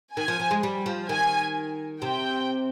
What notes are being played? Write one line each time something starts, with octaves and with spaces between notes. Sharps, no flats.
D#3 G#5
F3
F3
G#3
G3
F3
D#3 G#5
C3 G5